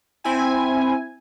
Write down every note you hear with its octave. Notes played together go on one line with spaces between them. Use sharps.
C4 E4 G#5